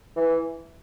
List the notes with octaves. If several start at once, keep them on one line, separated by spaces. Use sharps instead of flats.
E3